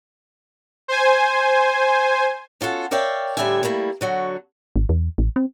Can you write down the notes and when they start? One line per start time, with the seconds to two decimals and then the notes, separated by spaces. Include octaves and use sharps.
0.88 C5 G#5
2.61 C#4 F4 F#4 A4 F#5
2.91 A#4 C#5 D5 E5 F5 G5
3.37 A2 D3 G3 G4 E5 G#5
3.63 G3 A3 A#3 E4
4.01 D3 F#3 F#4
4.76 G#1
4.89 E2
5.18 A1
5.36 C4